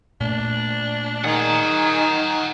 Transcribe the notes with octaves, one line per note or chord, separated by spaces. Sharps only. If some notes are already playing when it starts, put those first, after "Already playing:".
A#2 A3 D4
D#3 G#4 F#5 A#5